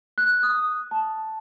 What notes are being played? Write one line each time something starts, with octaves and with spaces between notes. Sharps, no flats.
F#6
D#6
A5